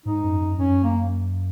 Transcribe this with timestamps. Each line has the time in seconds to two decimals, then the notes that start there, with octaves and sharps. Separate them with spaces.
0.05 G#2 D#4
0.24 F#2
0.41 F#2
0.58 F#2 C#4
0.84 A#3